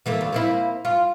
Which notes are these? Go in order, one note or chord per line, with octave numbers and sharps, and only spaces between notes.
E3 A3 A#3
D2
A#3 C4 E4
F4